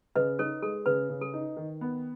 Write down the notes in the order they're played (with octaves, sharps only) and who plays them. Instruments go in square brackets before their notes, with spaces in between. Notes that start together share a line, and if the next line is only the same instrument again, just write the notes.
[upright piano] C#3 [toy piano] B4 D#5
[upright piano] D#4 [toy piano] A4 C#5
[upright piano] G#3 [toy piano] A4
[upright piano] C#3 [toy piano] B4
[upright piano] C#3
[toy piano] A4
[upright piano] D#4
D#3
B3